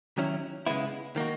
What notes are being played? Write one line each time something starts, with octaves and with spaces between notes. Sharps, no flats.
D#3 F#3 C#4 E4
C#3 G#3 B3 E4
D#3 A#3 D#4 F#4